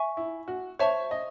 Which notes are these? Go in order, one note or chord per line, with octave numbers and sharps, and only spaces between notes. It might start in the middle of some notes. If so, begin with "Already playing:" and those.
Already playing: E5 G#5 C#6
E4
F#4
C5 C#5 E5 A5 C#6
D#5